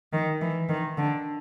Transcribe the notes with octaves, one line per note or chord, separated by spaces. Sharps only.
D#3
E3
D#3
D3